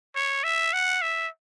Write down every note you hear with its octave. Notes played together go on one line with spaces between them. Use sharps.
C#5
E5
F#5
E5